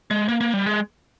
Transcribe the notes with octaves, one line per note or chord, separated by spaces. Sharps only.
G#3
A#3
A#3
G3
G#3